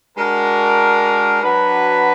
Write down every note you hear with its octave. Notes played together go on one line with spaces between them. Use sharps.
G#3 D4 F#4 A#4
F#3 D4 F#4 B4